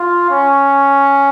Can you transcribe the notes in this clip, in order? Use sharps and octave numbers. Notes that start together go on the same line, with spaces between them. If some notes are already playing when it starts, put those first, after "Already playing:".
Already playing: F4
C#4